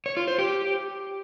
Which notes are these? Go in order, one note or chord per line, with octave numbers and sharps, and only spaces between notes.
C#5
F4
C5
G4